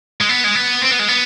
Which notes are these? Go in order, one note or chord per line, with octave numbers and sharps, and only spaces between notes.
G#3
B3
G#3
B3
C4
B3
G#3
B3